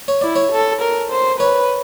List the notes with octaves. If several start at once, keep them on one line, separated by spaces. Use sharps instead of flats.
C#5
E4 D5
C#5
A4
A#4
C5
B4 C#5